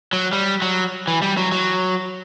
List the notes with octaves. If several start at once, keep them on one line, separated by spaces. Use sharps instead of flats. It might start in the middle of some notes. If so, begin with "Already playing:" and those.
F#3
G3
F#3
E3
G3
F#3
F#3